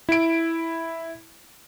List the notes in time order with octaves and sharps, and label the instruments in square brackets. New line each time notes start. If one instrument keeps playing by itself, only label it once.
[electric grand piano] E4 D7